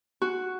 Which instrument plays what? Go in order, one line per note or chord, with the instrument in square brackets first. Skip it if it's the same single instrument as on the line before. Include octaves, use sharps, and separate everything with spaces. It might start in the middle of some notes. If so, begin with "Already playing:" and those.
[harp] F#4